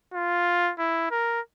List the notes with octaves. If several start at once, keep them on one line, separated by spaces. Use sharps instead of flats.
F4
E4
A#4